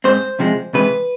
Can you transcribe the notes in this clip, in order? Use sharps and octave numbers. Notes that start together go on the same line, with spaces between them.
G#2 G#3 C4 C5
C2 C3 F3 G#3
C2 C3 E3 G#3 B4